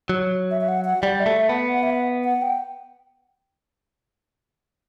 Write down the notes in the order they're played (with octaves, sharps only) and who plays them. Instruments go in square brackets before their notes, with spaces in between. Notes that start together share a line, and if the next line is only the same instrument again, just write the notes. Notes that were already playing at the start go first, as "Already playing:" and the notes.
[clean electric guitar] F#3
[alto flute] E5
E5
F#5
F#5
[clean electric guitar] G3 [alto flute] D5
[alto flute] E5
[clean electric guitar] A3
[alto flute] E5
[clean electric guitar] B3
[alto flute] F#5
F#5
E5
F#5
F#5
G5